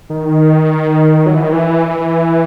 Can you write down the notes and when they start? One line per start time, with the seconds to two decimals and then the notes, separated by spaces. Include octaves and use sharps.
0.10 D#3
1.26 F#3
1.35 E3
1.44 D#3
1.52 E3